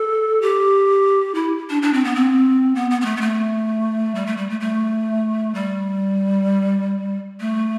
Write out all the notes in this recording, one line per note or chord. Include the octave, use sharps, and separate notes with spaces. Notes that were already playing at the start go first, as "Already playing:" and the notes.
Already playing: A4
G4
E4
D4
D4
C4
B3
C4
B3
B3
B3
A3
B3
A3
G3
A3
G3
A3
A3
G3
A3